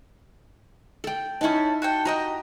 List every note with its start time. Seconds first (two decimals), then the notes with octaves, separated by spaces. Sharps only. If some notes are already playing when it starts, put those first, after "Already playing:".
1.04 A4 G5
1.41 C#4 D#4 E4 A4 A5
1.82 F#4 A4 G5
2.05 F#4 G4 D#5 A#5